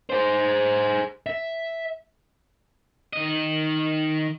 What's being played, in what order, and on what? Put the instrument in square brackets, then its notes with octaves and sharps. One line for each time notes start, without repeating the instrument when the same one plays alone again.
[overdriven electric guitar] G#4 C5
E5
[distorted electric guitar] D#3 D#5